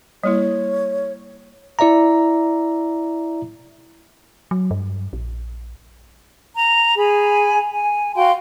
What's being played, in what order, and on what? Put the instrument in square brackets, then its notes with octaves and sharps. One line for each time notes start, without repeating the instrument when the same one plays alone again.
[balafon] G3 A#3 E4 [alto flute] C#5
[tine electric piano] E4 D5 E5 A#5
[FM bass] F#3
G2
A#1
[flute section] A#5
G#4 G#5 B5
G#5
F#4 F5 G5 C6